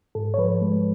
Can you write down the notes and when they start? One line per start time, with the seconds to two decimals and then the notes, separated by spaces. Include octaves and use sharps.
0.15 G#2 A4
0.34 C#5
0.38 F3 B4
0.62 G#3